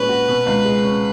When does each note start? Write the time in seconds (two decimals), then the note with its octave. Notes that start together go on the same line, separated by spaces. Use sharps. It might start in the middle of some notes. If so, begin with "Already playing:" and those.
Already playing: A#2 G#3 C#4 B4
0.09 F#4
0.28 B2
0.46 C#2
0.65 G#3
0.84 C#4